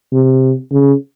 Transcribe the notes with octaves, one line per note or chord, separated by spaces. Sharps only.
C3
C#3